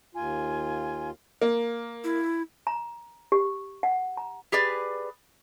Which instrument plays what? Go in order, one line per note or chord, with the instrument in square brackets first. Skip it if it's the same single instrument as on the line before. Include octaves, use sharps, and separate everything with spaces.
[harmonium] D#2 F4 [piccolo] G#5
[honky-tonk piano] A#3
[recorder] E4
[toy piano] A#5
G4
F#5
A#5
[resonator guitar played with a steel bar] G4 G#4 B4 D5